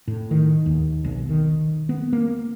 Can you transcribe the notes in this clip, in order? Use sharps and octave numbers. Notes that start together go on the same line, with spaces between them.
A2
D#3
D#2
B1
D#3
B3
A#3